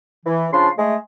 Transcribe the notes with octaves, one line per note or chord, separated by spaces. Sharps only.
E3
C#3 F3 D4 C6
G#3 A3